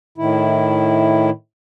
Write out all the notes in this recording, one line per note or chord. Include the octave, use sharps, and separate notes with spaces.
A2 D#3 E4